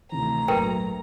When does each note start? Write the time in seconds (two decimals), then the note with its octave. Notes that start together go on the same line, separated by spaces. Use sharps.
0.12 D2 C3 D#3 E3 A#5
0.48 G#1 A#2 F#3 A#4 B4 G5